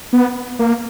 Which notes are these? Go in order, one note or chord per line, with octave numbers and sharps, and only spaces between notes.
B3
A#3